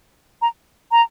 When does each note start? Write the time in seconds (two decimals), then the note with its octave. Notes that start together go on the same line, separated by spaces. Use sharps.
0.42 A#5
0.92 A#5